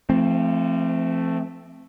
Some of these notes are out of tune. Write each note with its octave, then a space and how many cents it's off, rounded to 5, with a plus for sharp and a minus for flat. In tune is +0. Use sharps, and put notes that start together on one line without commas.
F3 -35 A3 +0 C4 +0